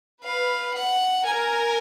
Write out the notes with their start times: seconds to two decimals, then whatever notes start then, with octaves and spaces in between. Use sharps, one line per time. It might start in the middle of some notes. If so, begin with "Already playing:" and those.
0.24 B4 F5
0.75 F#5
1.26 A#4 G#5